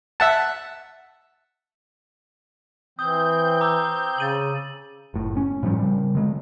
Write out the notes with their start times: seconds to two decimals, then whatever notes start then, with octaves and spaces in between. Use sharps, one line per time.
0.20 E5 F#5 A5
2.99 E3 C4 D#6 G6
3.61 A#5 D6 E6
4.18 C#3 A6 D#7 F#7
5.14 F#1 A2
5.37 C#4
5.63 A2 F3 G3 C#4
5.79 C#3 G3
6.15 D3 G#3